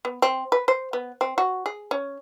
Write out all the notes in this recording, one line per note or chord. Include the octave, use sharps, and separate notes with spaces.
B3
C4
B4
C5
B3
C4
F#4
G#4
C#4